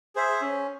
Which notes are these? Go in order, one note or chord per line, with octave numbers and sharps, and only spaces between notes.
G#4 C5 E5
C#4